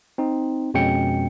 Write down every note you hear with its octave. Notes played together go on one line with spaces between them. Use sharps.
C4 D#4
F2 B2 G#3 C#4 G5 C#7